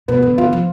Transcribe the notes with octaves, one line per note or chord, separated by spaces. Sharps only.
B2 B3
D3
D3 F4
F3